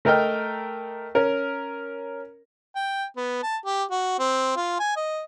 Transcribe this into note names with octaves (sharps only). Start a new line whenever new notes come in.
A3 A#4 D#5 G5 F6
C#4 A#4
G5
B3
A5
G4
F#4
C4
F4
G#5
D#5